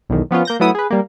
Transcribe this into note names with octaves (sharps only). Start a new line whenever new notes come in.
B1 E2 D#3
F3 B3 C#4 F4
A#3 G6 A#6
F#3 A3 B3 E4 D#6
G#4 B4
G3 A#3